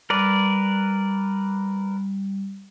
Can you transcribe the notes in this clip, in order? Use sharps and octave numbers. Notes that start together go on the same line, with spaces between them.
G3 A#4 B4 D5